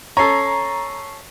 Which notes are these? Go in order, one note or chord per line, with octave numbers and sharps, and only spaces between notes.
C#4 A4 A#5 C#6 C7